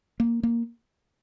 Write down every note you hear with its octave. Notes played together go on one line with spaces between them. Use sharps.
A#3
A#3